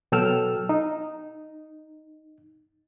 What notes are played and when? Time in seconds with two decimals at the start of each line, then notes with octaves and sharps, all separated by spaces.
0.12 B2 F#3 A4 G5 E6 F6
0.69 D#4